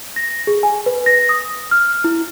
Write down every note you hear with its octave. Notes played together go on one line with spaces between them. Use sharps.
A#6
G#4
G#5
B4
A#6
D#6
F6
E4